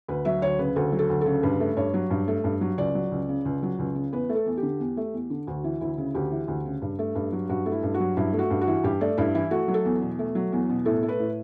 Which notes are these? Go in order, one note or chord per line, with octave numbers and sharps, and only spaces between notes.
D2 B4
F#3 E5
D2 C#5
C#3 B4
D2 A4
F#3
A4
D2
C#3 A4
G2 B4
A3
G2 C#5
F#3
G2
A3
G2
F#3
C#2 D5
F#3
C#2
C#3
C#2
F#3
C#2
C#3
E2 B4
A3
A4
E2
G4
D3
E2
A3
E2
D3
D2 F#4
E3
D2 E4
C#3
D2 G4
E3
D2
C#3
G2
A3
G2
F#3
G2 F#4
A3
E4
G2
F#4
F#3
G2 E4
A3
F#4
G2
F#4
E3
G2 G4
A3 D5
G2 E4
E3 E4
A3 F#4
F#3
A4
E2
B2
A3
F#3
E2
B2
A2 A4
A3
B4
A2